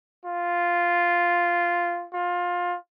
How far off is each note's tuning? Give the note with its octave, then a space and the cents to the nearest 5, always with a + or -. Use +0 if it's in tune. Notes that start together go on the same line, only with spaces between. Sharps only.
F4 -5
F4 +20